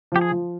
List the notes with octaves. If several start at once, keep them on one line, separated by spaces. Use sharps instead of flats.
F3 G4
G#4
F3